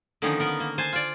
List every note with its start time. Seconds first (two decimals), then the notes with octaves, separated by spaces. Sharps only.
0.22 D3 D#3 F3 A#3 C#4 D#4
0.40 B3 A#4 B4
0.60 A#3
0.78 C5 G#5 A5
0.93 F4 D5